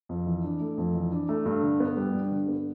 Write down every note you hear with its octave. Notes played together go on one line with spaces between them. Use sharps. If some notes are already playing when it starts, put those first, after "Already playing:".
F2
E3
D4
A3
F2
E3
D4
A3
G2
D3
B3
G3
G2
D3
B3